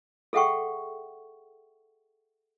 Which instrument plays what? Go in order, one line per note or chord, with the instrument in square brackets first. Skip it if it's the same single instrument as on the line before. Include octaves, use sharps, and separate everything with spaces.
[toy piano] G#4 A4 E5 F#5 G5 C#6